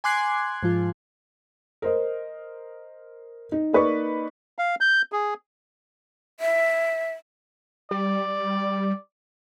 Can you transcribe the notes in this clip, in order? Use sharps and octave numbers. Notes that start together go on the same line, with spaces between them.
G#5 C6 D6 F#6 G#6 C7
G#2 F3 F4
A#4 C5 D#5
D#4
A#3 D#4 B4 D5 D#5 C#6
F5
G6
G#4
E5
G3 D5